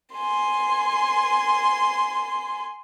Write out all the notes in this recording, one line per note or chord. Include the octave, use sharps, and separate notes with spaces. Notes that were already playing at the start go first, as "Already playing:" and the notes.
G#5 C6